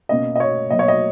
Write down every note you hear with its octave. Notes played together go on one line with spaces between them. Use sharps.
B2 A#3 C#4 D#5
D#5
C#5
B2 F#3 A#3 D#5
C#5
D#5